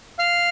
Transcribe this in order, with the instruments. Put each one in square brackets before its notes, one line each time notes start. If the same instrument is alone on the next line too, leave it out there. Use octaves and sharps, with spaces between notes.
[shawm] F5